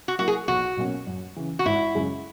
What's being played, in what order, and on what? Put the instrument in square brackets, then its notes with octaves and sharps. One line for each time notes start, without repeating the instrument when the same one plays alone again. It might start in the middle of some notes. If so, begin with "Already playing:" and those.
[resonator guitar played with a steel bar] F#4
[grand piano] F#3 A#3 E4 A#4 [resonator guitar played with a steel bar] F#4
[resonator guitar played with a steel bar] G#4
[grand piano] B1 [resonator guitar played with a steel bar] F#4
[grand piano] B2 F#3 A#3 C#4
F#2
C#3 E3
[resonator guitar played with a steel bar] F#4
[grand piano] G#1 [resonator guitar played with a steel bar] E4
[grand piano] F#2 C#3 G#3